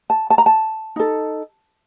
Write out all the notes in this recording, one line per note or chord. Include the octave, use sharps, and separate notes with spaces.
A5
A5
A#5
A5
D#4 A4